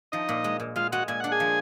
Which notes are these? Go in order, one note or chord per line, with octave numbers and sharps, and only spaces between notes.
F3 D#4 D#5
A#2
G#3
A#2
G#3 F4 F5
G#3 F#4 F#5
A#2 G#5
D4 F#5
G#4 G#5
F3